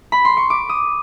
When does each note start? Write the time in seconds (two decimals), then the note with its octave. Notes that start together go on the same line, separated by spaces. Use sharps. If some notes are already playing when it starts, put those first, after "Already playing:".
0.12 B5
0.25 C6
0.37 C#6
0.50 D6
0.69 D#6